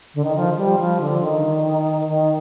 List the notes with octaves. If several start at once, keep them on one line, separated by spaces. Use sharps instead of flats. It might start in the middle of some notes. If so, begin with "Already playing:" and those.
D3
D#3
F3
F3
G3
F3
D3
D#3
D#3